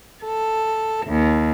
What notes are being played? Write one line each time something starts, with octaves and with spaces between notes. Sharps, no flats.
A4
D#2